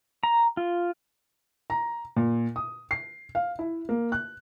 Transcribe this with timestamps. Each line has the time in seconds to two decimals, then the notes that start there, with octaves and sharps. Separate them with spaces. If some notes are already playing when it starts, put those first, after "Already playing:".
0.23 A#5
0.57 F4
1.70 A#5
2.16 A#2
2.56 D#6
2.91 C7
3.35 F5
3.59 E4
3.89 A#3
4.12 F#6